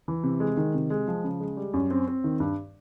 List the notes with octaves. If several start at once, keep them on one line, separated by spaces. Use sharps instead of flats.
E3
C3
G#3
D#3
C3
G#3
F3
C#3
G#3
G3
F#2
C4
C4
D#3
G2